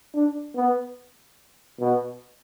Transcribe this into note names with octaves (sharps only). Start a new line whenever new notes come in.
D4
B3
B2